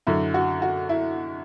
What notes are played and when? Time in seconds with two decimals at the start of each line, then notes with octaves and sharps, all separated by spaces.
0.07 F#2 D3 E4
0.34 F#4
0.62 F#4
0.89 E4